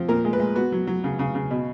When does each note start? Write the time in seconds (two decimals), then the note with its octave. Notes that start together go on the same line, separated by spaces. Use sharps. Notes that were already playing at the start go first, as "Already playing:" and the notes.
Already playing: F3 C4
0.08 A#2 A#4
0.25 G#3
0.33 B4
0.40 G#3
0.55 B3 F#4
0.72 F#3
0.87 F#3
1.04 C#3
1.19 C#3
1.35 C#3
1.51 B2